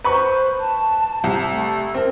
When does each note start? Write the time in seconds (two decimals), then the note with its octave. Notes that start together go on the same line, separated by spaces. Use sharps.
0.04 B4 C5 B5 C#6
0.59 A5
1.24 C2
1.51 A3
1.95 C4 A#4